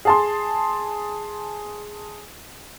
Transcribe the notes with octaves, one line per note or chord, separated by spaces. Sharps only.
G#4 A5 C6